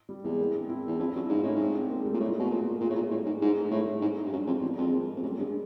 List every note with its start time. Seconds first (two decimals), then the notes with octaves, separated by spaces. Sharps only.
0.09 G3
0.24 E2 G#3
0.39 A#3 C4
0.54 C4 D4
0.69 D4 E4
0.88 E2
1.00 F2 D4 E4
1.15 F#2
1.25 E4
1.29 G#2 D#4 F4
1.43 A2 C#4 D#4
1.55 G#2 C4 D4
1.75 C4 D4
1.90 G#3 A#3
2.06 G3 A3
2.14 A#2
2.20 A2 G#3
2.29 A3
2.39 B2 G#3
2.50 A#2 B3
2.61 A#3
2.71 A3
2.81 A#2 G#3 A#3
2.90 A2
2.95 A#2
3.05 G#3
3.11 A2 G3
3.26 G#2
3.41 G#2 G#3
3.56 A3
3.65 G#2
3.70 A2 G#3
3.83 G3 A3
4.02 G#2
4.25 G2
4.32 F#2 G#3
4.47 F2 G3
4.62 E2 G3
4.78 F2 G#3
4.93 G#3 A#3
5.16 F2
5.23 F#2 G3 A3
5.38 G2 G#3